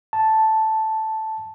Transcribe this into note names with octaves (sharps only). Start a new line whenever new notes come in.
A5